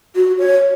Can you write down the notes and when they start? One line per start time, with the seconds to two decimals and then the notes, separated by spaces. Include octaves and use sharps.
0.16 F#4
0.38 C#5